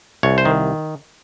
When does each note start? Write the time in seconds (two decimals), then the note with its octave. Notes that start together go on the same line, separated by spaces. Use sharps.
0.23 C2 C#5
0.38 C5
0.45 D#3